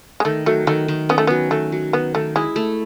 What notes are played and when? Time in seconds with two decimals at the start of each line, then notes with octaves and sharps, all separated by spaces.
0.20 G#3
0.25 D#3 A3
0.46 F#3 A3
0.67 D#3 A3
0.88 D#3
1.09 B3 C#4
1.18 A3
1.27 F#3 B3
1.51 D#3 A3
1.72 F#3
1.93 D#3 B3
2.15 D#3 A3
2.36 G#3 E4
2.56 A3